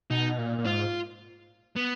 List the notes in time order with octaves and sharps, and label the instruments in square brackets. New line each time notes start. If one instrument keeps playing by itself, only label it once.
[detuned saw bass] B2 [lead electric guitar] D#4
[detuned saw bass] A#2
A#2
[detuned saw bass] G#2 [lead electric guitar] F4
[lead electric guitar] B3